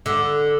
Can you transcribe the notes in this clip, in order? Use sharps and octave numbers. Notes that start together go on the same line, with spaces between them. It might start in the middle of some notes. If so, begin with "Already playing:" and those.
D3